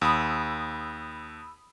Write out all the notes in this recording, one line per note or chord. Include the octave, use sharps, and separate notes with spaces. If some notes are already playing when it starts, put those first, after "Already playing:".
D#2 B5 D#6 E6